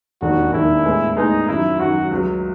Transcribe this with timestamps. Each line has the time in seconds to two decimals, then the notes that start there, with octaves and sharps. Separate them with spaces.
0.21 E1 D#2 D#3 F#4
0.53 E1 D#2 D#3 E4
0.85 A2 G#3 B3
1.16 A2 G#3 B3 D#4
1.48 F#2 D#3 F#3 E4
1.79 F#2 D#3 F#3 F#4
2.11 C#2 C#3 F#3